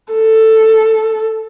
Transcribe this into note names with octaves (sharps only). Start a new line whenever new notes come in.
A4